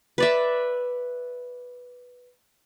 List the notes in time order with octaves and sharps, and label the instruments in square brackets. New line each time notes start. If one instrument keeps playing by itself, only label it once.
[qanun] B4 D5 E5